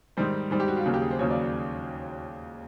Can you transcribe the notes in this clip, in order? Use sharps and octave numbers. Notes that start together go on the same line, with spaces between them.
G#2 D#3 G3 C5
G#2 D#3 G3 C5
G4
F#4
F4
D#2 C#3 F#3 A#3 F#4
G4
G#4
C5
D#2 C#3 F#3 A#3 C#5
D5